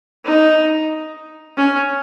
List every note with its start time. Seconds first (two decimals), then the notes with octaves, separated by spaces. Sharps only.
0.25 D#4
1.57 C#4